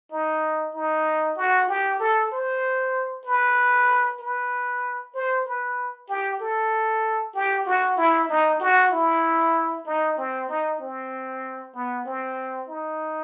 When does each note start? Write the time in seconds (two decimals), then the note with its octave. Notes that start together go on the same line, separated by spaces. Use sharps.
0.11 D#4
0.74 D#4
1.37 F#4
1.68 G4
1.99 A4
2.31 C5
3.26 B4
4.20 B4
5.14 C5
5.45 B4
6.09 G4
6.40 A4
7.34 G4
7.66 F#4
7.97 E4
8.29 D#4
8.60 F#4
8.91 E4
9.86 D#4
10.17 C4
10.48 D#4
10.80 C4
11.74 B3
12.05 C4
12.68 D#4